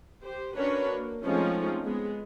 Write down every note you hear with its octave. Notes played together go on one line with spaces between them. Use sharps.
G4 C5
C#4 D4 F#4 A#4 B4 C#5
A#3
F3 G#3 A3 C4 C#4 D#4
G#3 B3 G#4